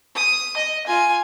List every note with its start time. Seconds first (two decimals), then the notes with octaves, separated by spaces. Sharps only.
0.16 D#6
0.57 D#5
0.87 F4 G#5